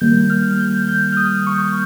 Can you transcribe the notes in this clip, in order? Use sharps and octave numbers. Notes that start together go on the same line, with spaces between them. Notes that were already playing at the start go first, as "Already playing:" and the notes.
D#3 G3 A#3 G6
F6
G6
G6
F6
D#6
C#6